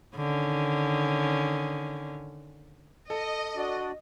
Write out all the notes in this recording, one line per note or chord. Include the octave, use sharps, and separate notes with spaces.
D3 D#3 C#4
A4 D#5
D4 F#4 D5